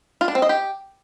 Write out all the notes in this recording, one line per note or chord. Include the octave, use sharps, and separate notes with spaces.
F4
D4
C4
D#5
G4